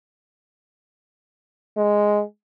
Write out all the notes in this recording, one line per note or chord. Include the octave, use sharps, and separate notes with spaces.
G#3